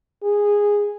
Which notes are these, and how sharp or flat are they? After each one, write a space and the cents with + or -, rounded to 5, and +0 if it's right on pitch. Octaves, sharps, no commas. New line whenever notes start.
G#4 -10